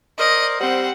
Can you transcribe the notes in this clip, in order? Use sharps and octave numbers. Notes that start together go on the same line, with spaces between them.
A#4 C5 D5 D#5
G3 C4 F#5